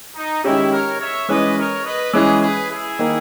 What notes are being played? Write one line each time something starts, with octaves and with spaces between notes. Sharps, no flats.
D#4
D#3 G#3 C#4 E4 G4
A#4 C#5
C#5 E5
E3 G#3 C#4 B4 D#5
A#4 C#5
B4 D#5
E3 G#3 C#4 G#4 B4
G#4 B4
E4 G#4
D#3 A#3